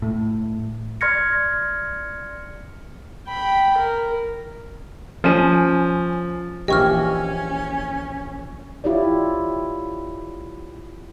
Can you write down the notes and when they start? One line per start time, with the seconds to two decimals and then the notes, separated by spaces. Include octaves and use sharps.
0.02 A2
1.01 D5 C6 F6 G#6 A#6 C#7
3.29 G5 B5
3.78 A#4
5.24 F3 C#4 G#5 D#7
6.68 A#1 E3 C#4 G4 D#5 C#6 F6
8.84 E4 F4 G4 C#5 D5